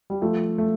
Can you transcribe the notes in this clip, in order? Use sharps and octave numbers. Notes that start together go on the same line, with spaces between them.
G3
F3 A3
A3